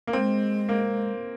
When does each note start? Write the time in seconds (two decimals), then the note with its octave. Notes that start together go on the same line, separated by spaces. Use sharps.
0.07 A#3
0.13 G#3 C4
0.69 A#3